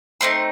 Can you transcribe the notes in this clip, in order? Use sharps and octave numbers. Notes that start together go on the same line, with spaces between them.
A3 C4 D#4 C6